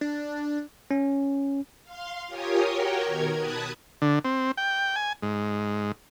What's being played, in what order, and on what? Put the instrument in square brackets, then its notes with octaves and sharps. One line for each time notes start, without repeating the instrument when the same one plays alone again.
[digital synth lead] D4
[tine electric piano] C#4
[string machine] F5 C6
F4 G4 A#4 C#5 G#5 D#6
F#4 G4 A#4 C#5 G5
B2 D#3 A#4 G#6
A5 B5 D#6 F#6 G#6
[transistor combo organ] D3
C4
G5
G#5
G#2